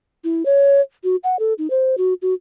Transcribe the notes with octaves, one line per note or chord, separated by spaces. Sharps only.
E4
C#5
F#4
F#5
A4
D#4
C5
F#4
F#4